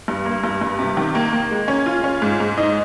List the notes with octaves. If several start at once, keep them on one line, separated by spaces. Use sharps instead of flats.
G2
A#3
G2
G2
C3
D#3
A#3
A#3
G#3
C#4
F4
C#4
G#2
G#2
D#4